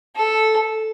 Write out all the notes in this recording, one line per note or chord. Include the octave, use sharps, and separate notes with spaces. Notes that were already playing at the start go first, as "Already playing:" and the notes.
A4